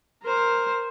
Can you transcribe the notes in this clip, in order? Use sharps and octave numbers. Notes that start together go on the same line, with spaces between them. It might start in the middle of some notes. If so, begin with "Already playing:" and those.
A#4 C5